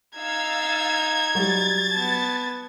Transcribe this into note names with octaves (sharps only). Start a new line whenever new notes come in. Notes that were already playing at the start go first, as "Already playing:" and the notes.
D#4 F5 E6 G#6 A6
F#3 G3 A6
B3 A5